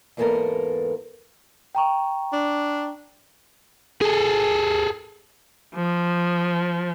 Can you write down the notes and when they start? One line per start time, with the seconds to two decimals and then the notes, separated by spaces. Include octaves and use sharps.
0.17 E2 G#2 A#3 B3 A4 A#4
1.75 G5 A#5 C#6
2.33 D4
4.01 G#4 A4
5.75 F3